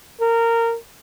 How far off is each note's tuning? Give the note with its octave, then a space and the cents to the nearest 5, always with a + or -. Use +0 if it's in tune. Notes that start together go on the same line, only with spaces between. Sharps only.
A#4 -20